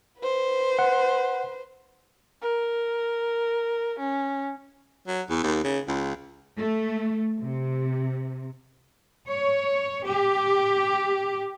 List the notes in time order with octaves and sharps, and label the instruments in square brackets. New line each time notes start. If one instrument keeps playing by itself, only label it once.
[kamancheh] B4 C5
[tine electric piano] F#5
[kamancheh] A#4
C#4
[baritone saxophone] F#3
E2
D#2
C#3
C#2
[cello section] A3
C3
C#5
G4